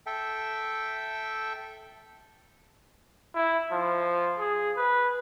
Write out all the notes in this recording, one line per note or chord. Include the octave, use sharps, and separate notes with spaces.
A4 E5 G5
E4
F3
G#4
B4